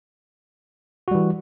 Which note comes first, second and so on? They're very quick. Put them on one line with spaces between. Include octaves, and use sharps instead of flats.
F#4 G3 E3